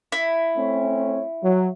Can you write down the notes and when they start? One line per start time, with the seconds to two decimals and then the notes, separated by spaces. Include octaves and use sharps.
0.12 E4
0.56 A3 C4 C#4
1.43 F#3